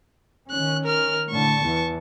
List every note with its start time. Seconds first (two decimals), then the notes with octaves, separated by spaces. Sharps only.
0.51 D#3 C#4 F#6
0.84 A#4 F6
1.31 A2 D3 A5 C#6
1.64 E2 E3